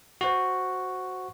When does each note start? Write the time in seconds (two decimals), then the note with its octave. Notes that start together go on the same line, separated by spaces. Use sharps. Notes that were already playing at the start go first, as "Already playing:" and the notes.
0.21 F#4 C5